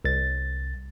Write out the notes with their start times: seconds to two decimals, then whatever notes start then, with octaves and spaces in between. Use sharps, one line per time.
0.05 C2 A6